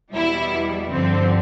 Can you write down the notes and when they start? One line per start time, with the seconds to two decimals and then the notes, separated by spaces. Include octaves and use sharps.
0.13 E2 B2 G3 E4
0.90 G2 D3 F3 C4